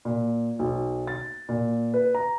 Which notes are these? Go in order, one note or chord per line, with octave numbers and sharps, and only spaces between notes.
A#2
B1
A6
A#2
B4
A#5